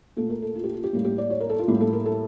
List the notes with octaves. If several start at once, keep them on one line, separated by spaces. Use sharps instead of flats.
A#2 A3 A4
A#4
A4
F4
G4
F4
G4
A2 G3 A#3
G4
D5
C#5
A#4
A4
F4
A2 G3 A#3 G4
A4
A#4
A4